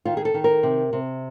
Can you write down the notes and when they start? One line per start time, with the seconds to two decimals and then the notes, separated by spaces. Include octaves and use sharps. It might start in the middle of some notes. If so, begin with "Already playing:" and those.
0.05 D#3 F4
0.17 G#4
0.25 A4
0.34 D#3
0.44 A#4
0.63 C3
0.93 C3